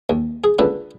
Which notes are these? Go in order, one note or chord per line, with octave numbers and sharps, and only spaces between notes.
D#2
G#4
C#2 D3 B4